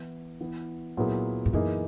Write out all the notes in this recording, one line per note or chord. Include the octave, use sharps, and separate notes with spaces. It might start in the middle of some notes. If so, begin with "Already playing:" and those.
Already playing: E3 B3 E4
E3 B3 E4 B4
A#2 F#3 B3 E4 G#4
G#2
F#2 E3 A#3 D#4 G#4